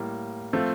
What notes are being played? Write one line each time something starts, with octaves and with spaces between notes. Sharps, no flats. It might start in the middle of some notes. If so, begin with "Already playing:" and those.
Already playing: A2 G3 A#3
F3 A3 C4 F4